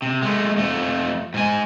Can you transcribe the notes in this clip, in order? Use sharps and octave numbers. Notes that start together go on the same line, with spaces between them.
C3
G#3 A3
F2 A3
G#2 G#5